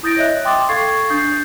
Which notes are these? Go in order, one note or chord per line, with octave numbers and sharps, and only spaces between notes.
E4 D#6 G6 A6 A#6 D7
C#5 D#5 E5 F#6
G5 C6 D6 D#6 A6
A4 F5 C#6 G#6 A6 C7
D4 D#6 G6 A6 C7